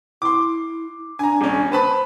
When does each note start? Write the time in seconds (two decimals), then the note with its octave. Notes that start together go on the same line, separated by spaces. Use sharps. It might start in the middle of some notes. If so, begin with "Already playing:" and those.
0.22 E4 C6 D6
1.19 D4 G#5 A#5
1.41 D#1 C#4
1.72 B4 C5 A5 B5